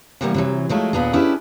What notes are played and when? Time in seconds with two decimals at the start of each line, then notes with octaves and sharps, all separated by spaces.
0.21 C3 E3 G3 A#3 B3
0.34 C3 E3 F#3
0.69 F3 F#3 G#3 A3
0.93 D#2 A#2 B3 D4 G#4
1.13 C#4 D4 E4 G4 G#4 B4